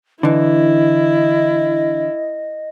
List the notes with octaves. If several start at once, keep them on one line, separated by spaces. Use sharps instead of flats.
D3 E3 E4 D#5